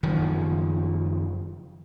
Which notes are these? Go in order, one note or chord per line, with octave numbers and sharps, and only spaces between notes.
F#1 D#3 F3